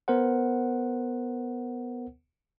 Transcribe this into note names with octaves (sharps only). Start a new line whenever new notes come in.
B3 A#4 C5 F#5